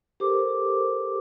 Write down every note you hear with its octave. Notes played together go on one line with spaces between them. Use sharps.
G4 A4 A#4 C5 D6